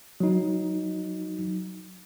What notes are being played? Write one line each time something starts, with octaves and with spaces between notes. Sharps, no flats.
F#3 D#4